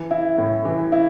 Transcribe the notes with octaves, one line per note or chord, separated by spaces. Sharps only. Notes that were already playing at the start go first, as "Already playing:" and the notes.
Already playing: E3
E4
A2
E3
E4